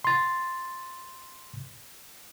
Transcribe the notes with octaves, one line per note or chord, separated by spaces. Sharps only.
C6 A6